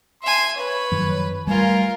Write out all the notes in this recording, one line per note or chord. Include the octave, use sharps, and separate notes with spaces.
E5 G#5 C6
B4 C#5
F#2 D#3 F3
G3 A3 F4 A#4 G#5